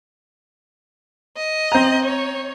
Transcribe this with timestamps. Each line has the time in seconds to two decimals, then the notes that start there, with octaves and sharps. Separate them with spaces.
1.37 D#5
1.72 C4 A#5
2.05 C#5